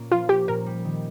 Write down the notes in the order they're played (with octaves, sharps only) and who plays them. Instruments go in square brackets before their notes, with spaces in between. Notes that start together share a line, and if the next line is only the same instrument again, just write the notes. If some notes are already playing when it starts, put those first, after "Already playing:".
Already playing: [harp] A#2 A#3 C#4
[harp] F3 [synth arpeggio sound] F4
[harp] C#4 [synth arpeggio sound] G4
[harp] A#2 [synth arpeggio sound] A#4
[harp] G3
D#3